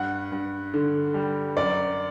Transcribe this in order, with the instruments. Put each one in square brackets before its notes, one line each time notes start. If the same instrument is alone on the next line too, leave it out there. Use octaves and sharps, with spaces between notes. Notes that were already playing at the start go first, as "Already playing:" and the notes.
Already playing: [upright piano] G2 F#5
G2
D3
G3
F#2 D5